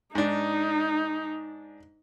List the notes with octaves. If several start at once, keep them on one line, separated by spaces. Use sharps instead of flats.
G#2 D4 D#4